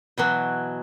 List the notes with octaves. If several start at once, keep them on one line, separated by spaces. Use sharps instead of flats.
B2 E3 F#3